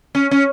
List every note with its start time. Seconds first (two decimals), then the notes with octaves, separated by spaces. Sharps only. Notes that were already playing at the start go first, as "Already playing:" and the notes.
0.15 C#4
0.31 C#4